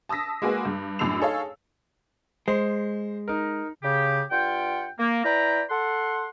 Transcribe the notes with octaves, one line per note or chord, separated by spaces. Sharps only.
A5 D#6 E6 A#6 B6
G#3 A#3 F#4 G#4 B4
G2
F#2 A2 D4 E6 C7 F7
D#4 G#4 A4 C#5 F5
G#3 C5
D#4 A#4
C#3 G4
G2 F4 F#5 G5
A#3
E4 B4 D5 G5 A#5
A4 F#5 C6